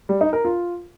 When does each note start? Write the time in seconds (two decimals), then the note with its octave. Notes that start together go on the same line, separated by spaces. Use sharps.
0.09 G3
0.21 D#4
0.33 A#4
0.45 F4